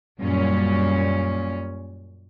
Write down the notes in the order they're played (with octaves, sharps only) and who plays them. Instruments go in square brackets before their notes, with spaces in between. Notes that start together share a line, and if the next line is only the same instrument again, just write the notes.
[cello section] F#2 A#2 G3 C#4